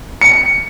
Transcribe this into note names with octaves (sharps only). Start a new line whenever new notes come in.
C#7